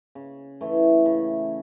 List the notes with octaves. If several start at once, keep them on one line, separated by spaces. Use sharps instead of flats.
C#3
E3 A3 E4
C#3